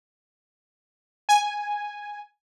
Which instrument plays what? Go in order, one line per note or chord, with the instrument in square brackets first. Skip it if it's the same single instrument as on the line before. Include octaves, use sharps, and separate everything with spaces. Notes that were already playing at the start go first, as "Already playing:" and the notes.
[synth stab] G#5